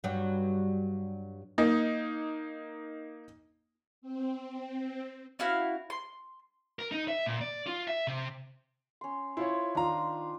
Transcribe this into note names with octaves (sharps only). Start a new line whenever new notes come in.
G2 F#3
A#3 D#4
C4
C#4 E4 F#4 F5
C6
A#4
D#4
E5
A#2
D5
F4
E5
C3
C#4 C6
E4 F4 C5 C#5
D#3 D4 F4 A#5